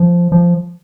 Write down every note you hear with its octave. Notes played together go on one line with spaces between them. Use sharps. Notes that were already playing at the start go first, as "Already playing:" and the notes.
Already playing: F3
F3